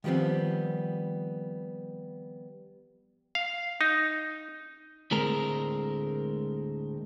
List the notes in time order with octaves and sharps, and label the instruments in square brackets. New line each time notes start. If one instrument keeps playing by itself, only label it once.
[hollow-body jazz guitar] D#3 F3 G3 B3 C4
[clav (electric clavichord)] F5
D#4
[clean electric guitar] D2 A2 G#3 C4 A#4